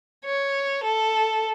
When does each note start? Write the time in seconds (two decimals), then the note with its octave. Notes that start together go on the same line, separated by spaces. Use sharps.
0.25 C#5
0.83 A4